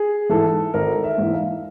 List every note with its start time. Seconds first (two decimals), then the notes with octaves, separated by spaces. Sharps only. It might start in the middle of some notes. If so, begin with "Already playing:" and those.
Already playing: G#4
0.29 G#2 E3 A4
0.74 G#1 A#4
1.04 E5
1.18 G#2 E3
1.33 F5